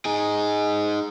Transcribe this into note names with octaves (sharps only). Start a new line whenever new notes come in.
D#4 G#4